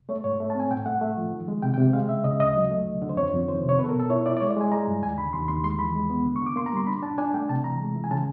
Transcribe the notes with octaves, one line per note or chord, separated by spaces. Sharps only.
A3 C#5
G#2 C#5
A3
A5
C4 G#5
A2 G5
A3 F#5
A3
F3
D#3
G#3
C3 G5
G5
C3
G#3 F5
C#3 E5
C#3 D#5
D2 D#5
F#3
A3
D3
D3
C5
F2 C#5
F2
D#3 C5
C3
C#5
B3 B4
A4
A#4
B2
A4
E4 C#5
E4 D5
D5
G#3 C#5
D5
G#3 G#5
G#3 A#5
G2
D#2 G#5
D3 B5
D#2 C6
D#2 C6
G#3 C6
E3 B5
G#3
B3
D3
C#6
D3
D6
A#3 C6
A#5
G3 C6
D4 B5
D4 A5
D4 G#5
A3 G5
C3 A5
E3 A#5
G#3
E3
G#5
C#3 A5